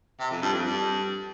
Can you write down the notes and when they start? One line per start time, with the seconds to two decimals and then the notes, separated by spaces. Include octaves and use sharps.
0.19 C3
0.31 F2
0.42 G2
0.53 F2
0.65 G2